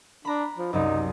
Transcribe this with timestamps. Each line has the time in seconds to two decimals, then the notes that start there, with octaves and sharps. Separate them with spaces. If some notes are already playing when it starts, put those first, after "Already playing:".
0.25 D4 A#5 B5
0.58 F3
0.73 C2 F#2 D#4